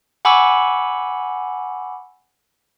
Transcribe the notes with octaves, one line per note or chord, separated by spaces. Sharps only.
F#5 G#5 B5 C#6 D6 E6